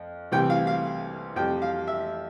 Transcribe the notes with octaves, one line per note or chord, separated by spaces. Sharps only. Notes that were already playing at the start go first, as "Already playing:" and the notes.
Already playing: F2
C2 C3 E3 G3 G5
F5
F5
F2 C3 G3 G5
F5
E5